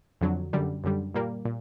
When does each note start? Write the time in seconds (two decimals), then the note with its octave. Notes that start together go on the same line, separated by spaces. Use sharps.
0.21 F2 D3 F#3
0.53 F#2 D3 G3
0.84 F#2 D3 G3
1.14 A#2 G3 A#3
1.45 A#2